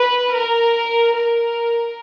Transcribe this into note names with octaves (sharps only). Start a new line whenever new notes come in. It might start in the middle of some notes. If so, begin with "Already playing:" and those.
Already playing: B4
A#4
A#4